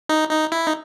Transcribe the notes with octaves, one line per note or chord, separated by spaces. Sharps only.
D#4
D#4
E4
D#4